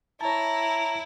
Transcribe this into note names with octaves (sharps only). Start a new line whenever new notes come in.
E4 C#5 A5 A#5